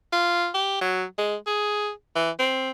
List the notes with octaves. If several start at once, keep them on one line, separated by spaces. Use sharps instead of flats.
F4
G4
F#3
G#3
G#4
E3
C4